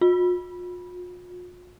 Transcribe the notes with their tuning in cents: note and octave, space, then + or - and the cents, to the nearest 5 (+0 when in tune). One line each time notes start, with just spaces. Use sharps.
F4 +45